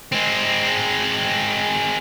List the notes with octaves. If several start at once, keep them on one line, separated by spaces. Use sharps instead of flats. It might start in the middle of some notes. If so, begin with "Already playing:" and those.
G#3 C4